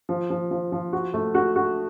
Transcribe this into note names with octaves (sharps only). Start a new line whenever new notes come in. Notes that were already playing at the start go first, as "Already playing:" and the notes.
F3
F3
F3
F3
F#4
A3
F#4
F#4